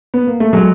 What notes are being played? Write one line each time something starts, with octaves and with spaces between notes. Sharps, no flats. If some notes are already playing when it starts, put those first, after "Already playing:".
B3
A#3
A3
F#3 G#3